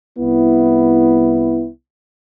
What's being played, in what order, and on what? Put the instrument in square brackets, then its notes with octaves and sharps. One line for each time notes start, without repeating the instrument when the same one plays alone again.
[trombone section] C2 B3 E4